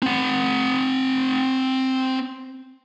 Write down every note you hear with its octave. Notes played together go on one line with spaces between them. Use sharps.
C4 F#5